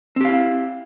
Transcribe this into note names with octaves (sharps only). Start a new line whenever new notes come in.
C4 E4 G4 F5